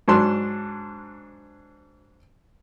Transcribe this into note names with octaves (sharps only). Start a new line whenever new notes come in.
G#2 F#3 D4 C6